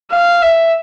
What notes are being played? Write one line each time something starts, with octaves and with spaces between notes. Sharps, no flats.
F5
E5